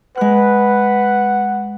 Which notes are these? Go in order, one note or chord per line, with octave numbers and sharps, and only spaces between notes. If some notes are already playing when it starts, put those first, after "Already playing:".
G#3 B4 F#5 F#6